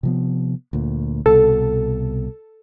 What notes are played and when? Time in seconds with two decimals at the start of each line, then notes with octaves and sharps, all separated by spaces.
0.03 C3 F3 B3
0.73 D2 A#2
1.26 C2 B2 A4